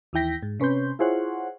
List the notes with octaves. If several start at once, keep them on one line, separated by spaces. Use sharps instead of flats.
D#2 E3 E4 G5 A#6 B6
G#2
C3 C#4 B4 C6 G6
E4 F4 G#4 C5 C#5 F#5